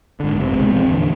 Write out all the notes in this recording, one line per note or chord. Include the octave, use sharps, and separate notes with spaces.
G#2 D3
F#1 C3
C2 B2 G#3 C4
E1 A1 F3 C4
E2 A#2 D3